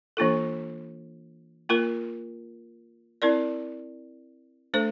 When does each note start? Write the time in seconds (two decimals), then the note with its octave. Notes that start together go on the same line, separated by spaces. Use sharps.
0.17 E3 A#3 D4 F4 A4
1.69 A#3 F4 A#4
3.22 C4 E4 A#4 D5
4.74 A3 D4 A4 C5